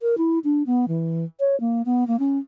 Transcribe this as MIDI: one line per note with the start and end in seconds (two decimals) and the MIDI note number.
0.01 0.15 70
0.18 0.39 64
0.44 0.63 62
0.66 0.86 59
0.88 1.25 52
1.40 1.58 73
1.60 1.82 58
1.86 2.07 59
2.07 2.19 58
2.19 2.38 61